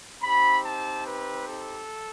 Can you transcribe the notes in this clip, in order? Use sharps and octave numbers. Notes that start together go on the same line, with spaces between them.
C4 D#4 G4 B5
A5
B4
A4